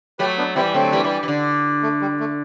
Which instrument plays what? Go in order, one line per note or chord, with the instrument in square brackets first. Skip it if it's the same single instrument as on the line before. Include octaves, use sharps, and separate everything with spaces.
[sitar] F#3 A3 [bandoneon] G4 B4
[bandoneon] B3 D4
[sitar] E3 G3 [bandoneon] C4 E4
[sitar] D3 F#3 [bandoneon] A3 C4
[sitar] E3 G3
E3 G3
E3
D3
[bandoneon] A3
G3
A3